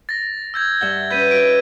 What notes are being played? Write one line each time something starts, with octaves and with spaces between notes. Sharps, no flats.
A6 A#6
E6 G6 G#6
G2 E5 F#5 G7
C#4 B4 G6 B6 D#7
D#4 F#4 D7